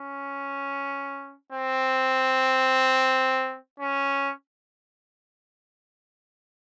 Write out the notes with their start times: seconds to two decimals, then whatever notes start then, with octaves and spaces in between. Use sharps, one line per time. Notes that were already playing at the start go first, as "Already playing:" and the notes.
Already playing: C#4
1.53 C4
3.80 C#4